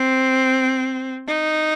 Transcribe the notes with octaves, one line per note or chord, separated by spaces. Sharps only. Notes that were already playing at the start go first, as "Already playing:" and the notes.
Already playing: C4
D#4